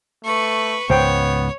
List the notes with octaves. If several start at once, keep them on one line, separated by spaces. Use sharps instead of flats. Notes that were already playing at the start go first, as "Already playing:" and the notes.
A3 B4 C#6
C#2 G#2 B3 C5 C#5 G5